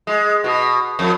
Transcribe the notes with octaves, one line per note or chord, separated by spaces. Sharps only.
G#3
B2
F2